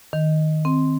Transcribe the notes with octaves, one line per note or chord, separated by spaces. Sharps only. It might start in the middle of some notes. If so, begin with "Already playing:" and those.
D#3
C4